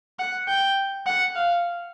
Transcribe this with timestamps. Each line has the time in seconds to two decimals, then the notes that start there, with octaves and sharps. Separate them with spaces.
0.19 F#5
0.48 G5
1.06 F#5
1.36 F5